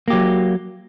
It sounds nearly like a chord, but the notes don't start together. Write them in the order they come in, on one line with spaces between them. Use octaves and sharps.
A#3 G4 F#3